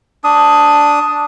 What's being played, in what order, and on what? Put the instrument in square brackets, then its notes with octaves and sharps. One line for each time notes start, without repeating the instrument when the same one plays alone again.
[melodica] D4 D#6